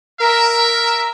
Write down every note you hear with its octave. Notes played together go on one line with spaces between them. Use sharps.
A#4 E5